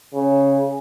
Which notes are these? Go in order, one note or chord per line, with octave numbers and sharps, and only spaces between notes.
C#3